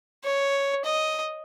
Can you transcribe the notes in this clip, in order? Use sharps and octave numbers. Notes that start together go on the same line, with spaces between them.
C#5
D#5